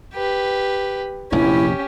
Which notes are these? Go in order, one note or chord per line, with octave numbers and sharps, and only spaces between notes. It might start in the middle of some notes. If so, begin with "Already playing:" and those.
G4 B4
F1 A#1 E2 C#4 E4 G4